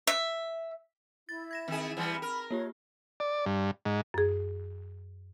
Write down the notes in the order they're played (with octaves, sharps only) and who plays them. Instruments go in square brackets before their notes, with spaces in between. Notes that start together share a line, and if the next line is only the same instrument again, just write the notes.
[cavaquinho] E5
[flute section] E4 [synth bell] A6
[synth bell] G#6 A#6 E7
[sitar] D#3 G#4 [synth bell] C4 E7
[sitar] E3 G3 B3
[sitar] A#4 [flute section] B5 [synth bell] F6
[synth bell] A#3 F4 G4 [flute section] C#5
[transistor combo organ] D5
G2
G#2
[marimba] F#2 G#4